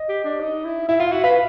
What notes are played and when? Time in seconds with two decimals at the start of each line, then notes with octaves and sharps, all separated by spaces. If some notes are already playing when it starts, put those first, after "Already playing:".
Already playing: D#5
0.09 G4
0.24 D4
0.40 D#4
0.64 E4
0.88 E4 E5
1.00 F4 F5
1.12 F#4 E5
1.24 B4 F5